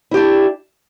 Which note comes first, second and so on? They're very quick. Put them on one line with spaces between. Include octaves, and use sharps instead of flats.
E4 G4 D4